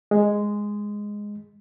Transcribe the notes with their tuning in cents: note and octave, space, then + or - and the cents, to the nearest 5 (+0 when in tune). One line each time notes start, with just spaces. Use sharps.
G#3 -5